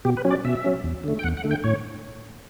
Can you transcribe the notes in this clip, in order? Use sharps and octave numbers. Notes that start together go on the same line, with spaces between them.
B2 G4
B4
F#3 C#4
D5
B2 E5
F#3 C#4
E2
D3 A3
G5
E2 F#5
F#5
D3 A3
G5
A2 C#5